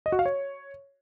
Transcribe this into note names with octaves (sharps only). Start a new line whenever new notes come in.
D#5
F#4
F5
C#5